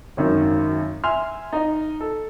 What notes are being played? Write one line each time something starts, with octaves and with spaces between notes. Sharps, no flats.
G#1 F#2 D#3
E5 G#5 C6 F6
D#4 D#5
A4